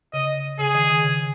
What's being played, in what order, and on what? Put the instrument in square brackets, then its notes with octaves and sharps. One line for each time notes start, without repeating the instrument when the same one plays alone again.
[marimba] C#3 [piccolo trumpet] D#5
[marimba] C#3 [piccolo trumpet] G#4
[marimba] D#3
D#3
C#3